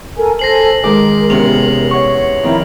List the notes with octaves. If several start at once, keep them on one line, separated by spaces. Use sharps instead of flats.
A4 A#4 G#5
A4 C5 G#5 A#6 C7 F#7
D#3 G#3 A#4 D6
E2 C3 C#4 F7 F#7
C#5 F#5 C#6
D#3 F3 C4 E4 A#4 A#5